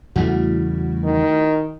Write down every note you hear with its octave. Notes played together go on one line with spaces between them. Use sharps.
E2 C#3 G3 A3 E4 F#4
D#3